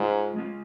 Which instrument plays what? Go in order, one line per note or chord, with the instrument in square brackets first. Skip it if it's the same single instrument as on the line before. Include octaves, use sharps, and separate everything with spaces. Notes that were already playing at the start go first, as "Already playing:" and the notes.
Already playing: [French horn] G#2 [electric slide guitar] G#3 C#4 F4
[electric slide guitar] G#3 C#4 F4